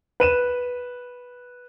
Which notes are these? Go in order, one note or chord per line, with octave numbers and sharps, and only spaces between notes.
B4 D#7 E7